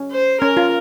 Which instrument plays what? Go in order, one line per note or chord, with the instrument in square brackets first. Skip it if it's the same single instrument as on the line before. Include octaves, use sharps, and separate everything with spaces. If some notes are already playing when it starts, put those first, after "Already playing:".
Already playing: [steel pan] C#4
[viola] C5
[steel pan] C#4 [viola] A#4
[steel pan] F4